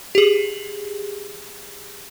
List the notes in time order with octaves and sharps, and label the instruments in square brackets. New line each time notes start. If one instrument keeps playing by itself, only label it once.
[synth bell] G4 G#4